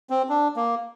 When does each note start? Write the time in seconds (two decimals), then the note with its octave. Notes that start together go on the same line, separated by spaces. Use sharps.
0.10 C4
0.29 D4
0.56 A#3